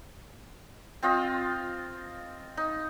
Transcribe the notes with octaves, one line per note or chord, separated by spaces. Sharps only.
C4 F4 D#5
D#4